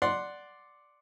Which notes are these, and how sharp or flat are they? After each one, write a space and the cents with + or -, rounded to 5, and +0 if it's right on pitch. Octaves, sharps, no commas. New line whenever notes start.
D5 +0 F#5 +0 C6 +0